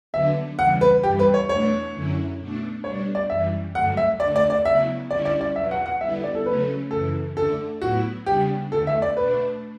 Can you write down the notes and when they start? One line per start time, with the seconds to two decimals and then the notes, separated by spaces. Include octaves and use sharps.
0.13 D3 F#3 B3 D4 E5
0.59 C#3 E3 G3 F#5
0.81 B4
1.03 G2 E3 G3 G4
1.19 B4
1.34 C#5
1.49 E2 B2 A3 D4 C#5
1.94 F#2 D3 F#3 C#4 E4
2.39 B2 A3 D4
2.84 B2 G3 D4 C#5
3.15 D5
3.30 F#2 E3 G3 E5
3.74 G2 D3 F#3 A3 F#5
3.97 E5
4.20 D3 A3 D4 D5
4.36 D5
4.50 D5
4.65 C#3 F#3 B3 E4 E5
5.10 D3 G3 C#4 E4 D5
5.25 D5
5.41 D5
5.56 E2 B2 F#3 E5
5.71 F#5
5.86 F#5
6.00 D3 G3 B3 E4 E5
6.24 D5
6.35 A4
6.45 C#3 F#3 A3 C#4 B4
6.91 F#2 C#3 E3 A4
7.37 D3 A3 D4 A4
7.81 A2 F#3 B3 E4 F#4
8.26 C#3 G3 B3 D4 G4
8.72 E2 D3 A3 A4
8.87 E5
9.02 D5
9.17 B2 A3 D4 B4